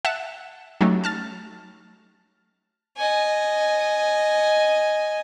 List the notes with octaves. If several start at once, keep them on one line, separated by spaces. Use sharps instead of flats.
E5 F#5 A5 F#6 E7
F#3 A3 C#4 D#4 G4
A5 F6 A6
D#5 G#5